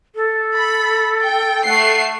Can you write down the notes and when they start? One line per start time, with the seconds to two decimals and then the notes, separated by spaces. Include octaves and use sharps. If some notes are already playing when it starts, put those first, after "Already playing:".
0.15 A4
0.56 B5
1.22 G5
1.65 A3 F#5 C7